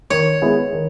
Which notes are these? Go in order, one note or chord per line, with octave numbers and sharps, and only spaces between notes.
D#3 C#5
G#3 B3 E4 G#4
D#3